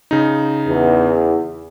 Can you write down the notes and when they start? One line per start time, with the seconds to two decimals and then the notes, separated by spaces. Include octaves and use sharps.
0.11 C#3 D#4
0.66 E2